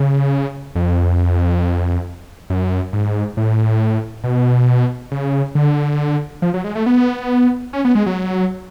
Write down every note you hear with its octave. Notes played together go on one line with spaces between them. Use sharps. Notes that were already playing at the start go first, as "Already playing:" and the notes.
Already playing: C#3
F2
F#2
G#2
A2
B2
C#3
D3
F3
F#3
G#3
A3
B3
C#4
B3
G#3
F#3